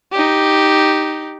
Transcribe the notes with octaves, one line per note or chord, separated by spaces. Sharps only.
D#4 G4